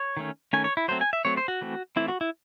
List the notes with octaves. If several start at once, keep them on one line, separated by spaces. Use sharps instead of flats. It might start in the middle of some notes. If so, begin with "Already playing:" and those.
Already playing: C#5
D#3 A3 C#4
D#3 A3 C#4 G#5
C#5
E4
F#3 A3 C4 C5
G#5
E5
F#3 A3 C4 C#5
C5
F#4
E3 A3 C4
E3 A3 C4 E4
F#4
E4